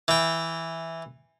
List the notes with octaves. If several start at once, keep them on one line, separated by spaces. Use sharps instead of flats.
E3 G5